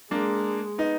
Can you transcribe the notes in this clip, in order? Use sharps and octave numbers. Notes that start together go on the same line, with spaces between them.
G#3 A#3 D4
B3 D#4